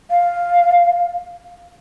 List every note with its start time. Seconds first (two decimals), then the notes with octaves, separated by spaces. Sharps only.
0.10 F5